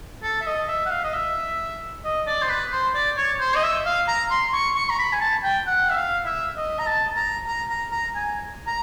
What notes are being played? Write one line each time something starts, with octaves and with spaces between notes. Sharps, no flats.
A4
E5
D#5
E5
F#5
F5
D#5
E5
D#5
D5
C5
B4
C5
D5
C#5
C5
D#5
E5
F5
A#5
C6
C#6
C#6
A#5
B5
G#5
A5
G5
F#5
E5
F5
E5
D#5
A#5
A5
A#5
A#5
A#5
A#5
G#5
A#5